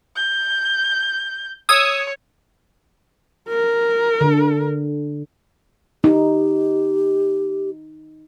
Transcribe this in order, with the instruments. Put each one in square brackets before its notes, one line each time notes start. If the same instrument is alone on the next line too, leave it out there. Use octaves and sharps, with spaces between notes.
[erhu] G6
[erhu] C#5 [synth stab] D#6 E6 G#6
[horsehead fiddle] A#4
[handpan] D3
[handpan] D#4 [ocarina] G4